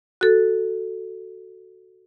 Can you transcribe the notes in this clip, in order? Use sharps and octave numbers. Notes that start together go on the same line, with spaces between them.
F#4 A4